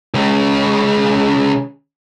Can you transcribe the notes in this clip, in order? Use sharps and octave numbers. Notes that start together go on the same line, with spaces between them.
C#2 C#3